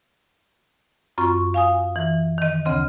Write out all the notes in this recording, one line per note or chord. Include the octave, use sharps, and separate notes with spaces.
F#2 C4 F4 C#6
F5 G#5 D#6
E3
D#3 D#5
D2 C#3 C4 D#5 F6